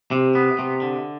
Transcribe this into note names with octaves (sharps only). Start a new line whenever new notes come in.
C3
B3
C3
D3